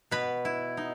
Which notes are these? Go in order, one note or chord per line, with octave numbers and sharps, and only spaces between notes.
B2 B4 B5
E4
D#4